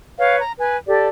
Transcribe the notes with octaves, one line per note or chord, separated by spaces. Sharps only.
B4 C#5 F5
A#5
B4 G#5
G4 A4 D5